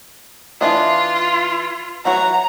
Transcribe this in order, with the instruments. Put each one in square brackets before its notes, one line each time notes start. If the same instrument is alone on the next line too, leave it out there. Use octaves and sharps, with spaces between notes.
[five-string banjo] E3 D4 D#5 [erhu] F4
[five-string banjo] E3 F#3 F#4 [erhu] A#5